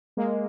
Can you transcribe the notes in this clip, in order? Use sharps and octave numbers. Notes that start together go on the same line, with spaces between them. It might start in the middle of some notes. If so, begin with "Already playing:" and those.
G#3 A#3